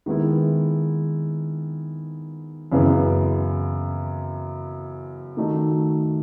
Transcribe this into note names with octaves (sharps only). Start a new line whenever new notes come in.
D#3 G#3 B3 E4
F#2 C#3 E3 B3
D#3 A3 D#4 F#4